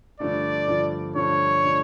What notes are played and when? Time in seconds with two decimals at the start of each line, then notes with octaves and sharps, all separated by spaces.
0.20 G2 D3 F3 A3 D4 D5
0.68 G2 D3 F3 A3 D4
1.16 G2 D3 F3 A3 D4 C#5
1.64 D3 F3 A3 D4